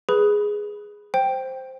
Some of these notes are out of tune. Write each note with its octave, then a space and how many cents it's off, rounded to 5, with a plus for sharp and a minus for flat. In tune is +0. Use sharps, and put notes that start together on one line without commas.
G#4 +0 B4 +0 B5 +0
C5 +0 G5 +0